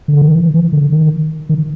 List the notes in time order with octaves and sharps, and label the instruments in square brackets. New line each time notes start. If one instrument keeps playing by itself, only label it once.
[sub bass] D3
D#3
E3
E3
D3
D#3
D#3